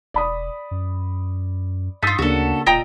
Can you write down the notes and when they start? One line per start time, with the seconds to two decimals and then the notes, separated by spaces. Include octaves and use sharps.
0.14 E1 D5 B5 D#6
0.71 F#2
2.03 G2 D#4 F4 E6 A6 B6
2.19 D2 C#3 A#3 D4 F#4 A4
2.66 D1 A#2 D#5 G5 A#5